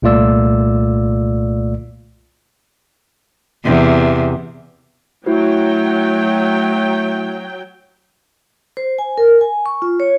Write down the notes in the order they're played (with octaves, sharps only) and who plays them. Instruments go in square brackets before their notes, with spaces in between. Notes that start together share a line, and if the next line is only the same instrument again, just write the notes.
[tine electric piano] C2 A#2 A3 F4 D5 E6
[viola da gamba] E2 C3
[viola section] F#3 G5 [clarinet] A3 [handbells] E4 F#4 C5
[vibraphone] C5
G#5
A#4
G#5
C#6
F4
C#5